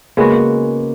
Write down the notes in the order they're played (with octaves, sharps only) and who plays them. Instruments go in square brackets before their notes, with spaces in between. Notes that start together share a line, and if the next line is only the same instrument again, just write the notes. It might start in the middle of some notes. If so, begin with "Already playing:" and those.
[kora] C#3 G#3 B3 F#4 [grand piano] A#3